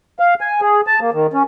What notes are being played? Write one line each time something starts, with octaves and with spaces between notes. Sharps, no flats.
F5
G#5
G#4
A5
A#3
D#3
C#4